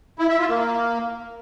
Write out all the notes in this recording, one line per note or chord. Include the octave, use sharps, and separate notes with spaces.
E4
E5
F4
A#3